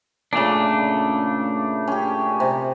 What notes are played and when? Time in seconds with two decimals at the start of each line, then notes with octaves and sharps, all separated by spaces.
0.33 A#2 C#3 A3 D4
1.88 C#4 G4
2.40 C3